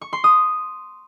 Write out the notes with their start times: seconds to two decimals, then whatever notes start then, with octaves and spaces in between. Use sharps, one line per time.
0.01 C#6
0.13 C6
0.24 D#6